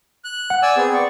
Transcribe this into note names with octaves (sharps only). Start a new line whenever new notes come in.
F#6
F#5
D5 G#5 E6
B3 C4 G#4
D5 C#6